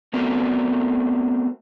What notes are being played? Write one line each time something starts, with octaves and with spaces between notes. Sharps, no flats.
A3 B3 C4 D4 F#4 A#4